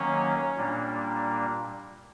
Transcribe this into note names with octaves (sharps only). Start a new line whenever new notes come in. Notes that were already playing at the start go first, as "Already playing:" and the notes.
Already playing: D#3 F#3 A#3 C#4
A#2 G3 A#3 D4